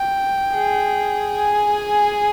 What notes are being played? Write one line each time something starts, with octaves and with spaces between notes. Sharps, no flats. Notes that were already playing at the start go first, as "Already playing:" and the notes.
Already playing: G5
G#4
G#5